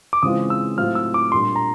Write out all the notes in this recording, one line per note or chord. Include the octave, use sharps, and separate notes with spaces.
D6
C#3 E3 G#3 C4 F4 D#6
E6
A2 F#3 A3 C4 F4 F6
E6
D6
A#2 G3 A#3 D4 C6
A#5